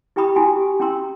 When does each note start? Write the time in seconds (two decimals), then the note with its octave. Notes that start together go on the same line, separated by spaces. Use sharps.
0.16 E4 G4 G5 A#5 B5 D#6
0.36 E4 F#4 G5 G#5
0.56 G4
0.80 C#4 E4 G5 A#5 C6 E6